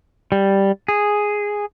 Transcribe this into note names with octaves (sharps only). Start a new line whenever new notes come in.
G3
G#4